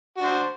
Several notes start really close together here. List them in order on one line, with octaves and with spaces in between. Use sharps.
F#4 D4 C5